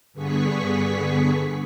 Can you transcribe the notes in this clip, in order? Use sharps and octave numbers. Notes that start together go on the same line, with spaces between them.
G2 D3 B3 G#4 C#6 B6